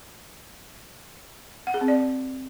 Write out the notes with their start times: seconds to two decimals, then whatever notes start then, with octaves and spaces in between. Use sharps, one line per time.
1.67 F#5
1.74 G#4
1.81 C4
1.88 D5